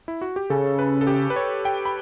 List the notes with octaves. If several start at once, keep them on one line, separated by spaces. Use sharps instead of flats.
E4
F#4
G4
C#3 A4
B4
A4
G4
B4
C#5
G5
B5